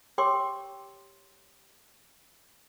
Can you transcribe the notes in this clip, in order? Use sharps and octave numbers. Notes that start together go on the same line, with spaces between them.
G4 C#5 G5 C6 D6 E6